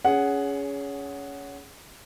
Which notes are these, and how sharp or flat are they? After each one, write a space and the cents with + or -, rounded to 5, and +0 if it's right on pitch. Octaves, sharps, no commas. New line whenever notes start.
C#4 +20 G#4 +0 F#5 +0